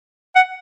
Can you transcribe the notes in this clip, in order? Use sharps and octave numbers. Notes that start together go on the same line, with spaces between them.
F#5